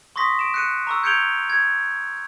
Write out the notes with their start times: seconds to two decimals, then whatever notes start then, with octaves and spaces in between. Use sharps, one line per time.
0.16 C6 C#6 D#6 A#6 B6
0.39 D7 E7
0.54 F#6 C#7 D#7
0.87 A#5 C#6 E6
1.04 G6 G#6 C#7 D7 F7 G7
1.50 G#6